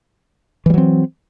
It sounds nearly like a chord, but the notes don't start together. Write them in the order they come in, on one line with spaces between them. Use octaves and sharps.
E3 G3 F#3 C4